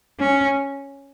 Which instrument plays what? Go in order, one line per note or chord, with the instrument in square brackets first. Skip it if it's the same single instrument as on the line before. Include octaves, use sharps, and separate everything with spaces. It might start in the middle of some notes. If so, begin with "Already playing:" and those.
[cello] C#4